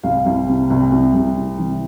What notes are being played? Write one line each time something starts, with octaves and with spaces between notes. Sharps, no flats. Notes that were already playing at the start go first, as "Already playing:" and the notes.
C2 F5
C2
C3
C2
C2
C2
C3
E3